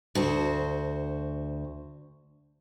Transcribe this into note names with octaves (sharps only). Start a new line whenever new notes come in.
D2 F#4 C5